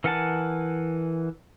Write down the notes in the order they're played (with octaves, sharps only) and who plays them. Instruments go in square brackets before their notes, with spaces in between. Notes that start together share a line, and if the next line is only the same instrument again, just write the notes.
[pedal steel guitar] E3 A#4 F#5 G#5 A5